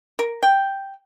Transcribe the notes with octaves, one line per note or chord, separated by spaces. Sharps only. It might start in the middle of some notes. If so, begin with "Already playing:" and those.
A#4
G5